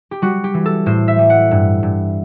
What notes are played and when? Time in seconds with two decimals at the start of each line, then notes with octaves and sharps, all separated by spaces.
0.11 G4
0.22 G3 F#4
0.44 G4
0.54 E3
0.66 A4
0.86 A2 C5
1.08 E5
1.19 G3
1.30 F#5
1.51 G2
1.83 G2